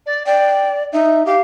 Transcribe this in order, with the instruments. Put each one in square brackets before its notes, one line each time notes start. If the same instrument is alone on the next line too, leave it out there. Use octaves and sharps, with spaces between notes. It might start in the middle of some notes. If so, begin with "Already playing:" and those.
[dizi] D5
[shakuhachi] D5 [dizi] G5
[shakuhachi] D#4 [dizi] E5
[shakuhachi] G4 [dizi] F5